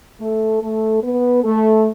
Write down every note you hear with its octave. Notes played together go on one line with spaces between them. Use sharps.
A3 A4
A3 A4
B3 B4
A3 A4